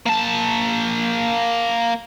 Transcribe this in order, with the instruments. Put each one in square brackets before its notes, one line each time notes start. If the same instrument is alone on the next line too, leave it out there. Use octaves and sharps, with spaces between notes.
[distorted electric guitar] A#3 A5